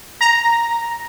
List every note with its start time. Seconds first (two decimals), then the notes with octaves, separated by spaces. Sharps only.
0.21 A#5